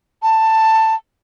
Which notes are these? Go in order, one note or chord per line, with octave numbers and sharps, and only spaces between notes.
A5